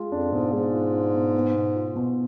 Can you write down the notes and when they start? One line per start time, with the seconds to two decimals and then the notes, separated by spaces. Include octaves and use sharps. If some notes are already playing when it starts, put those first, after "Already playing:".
Already playing: G#3 F4
0.12 F2 D4
0.32 G#2 B2
0.53 G#2 G#3
0.73 F4
0.93 D4
1.14 B2
1.34 B3
1.54 B2
1.75 F4
1.96 B2